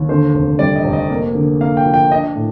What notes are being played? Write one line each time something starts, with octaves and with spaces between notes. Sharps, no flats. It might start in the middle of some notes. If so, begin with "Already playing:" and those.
Already playing: D#2
D3 C5
F1
G3 D5
D#5
F1
D#5
A#3
D3
A#3 F5
G5
F3
G5
D4 D#5
A2